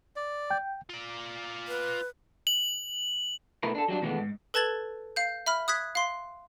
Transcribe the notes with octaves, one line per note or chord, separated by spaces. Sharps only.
D5
G5 G6
F4 D5
B4
F#7
B2 A3 E4 A#4 B4
D4 A4
F#3 G3 D4
B2 D#3 E3 G#3 A3 B3
G#2
A4 B4 A5 G#6 A6 F#7
F5 G6
E5 B5 F6
D#6 F#6 G#6 B6
F5 C6